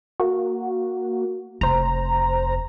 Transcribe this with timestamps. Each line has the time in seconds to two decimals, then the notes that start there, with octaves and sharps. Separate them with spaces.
0.20 A#3 F#4
1.61 F1 C5 A#5